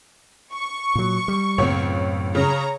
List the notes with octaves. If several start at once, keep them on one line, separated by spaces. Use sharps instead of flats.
C#6
A#2 F#3
G3
C#2 F#2 A2 B3 C4 C#5
C#3 C#5 A#5